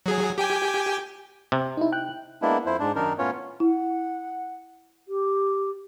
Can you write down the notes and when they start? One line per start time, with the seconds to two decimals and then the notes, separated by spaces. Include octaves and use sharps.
0.06 F#3 G#4
0.38 G4 G5 G#5
1.52 C3
1.77 D#4 E4
1.92 G5 F#6
2.42 G#3 A#3 B3 D4 E4
2.66 F2 E4 C5
2.80 G#2 D4
2.96 F#2 D#3 D4 D#4 A#4
3.18 A2 B3 C#4 F4 C#5
3.60 E4 F#5
5.08 G4